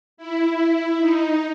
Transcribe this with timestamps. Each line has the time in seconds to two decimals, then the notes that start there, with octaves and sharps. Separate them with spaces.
0.17 E4
1.00 D#4